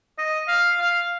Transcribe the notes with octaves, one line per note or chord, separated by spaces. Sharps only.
D#5
F5
F5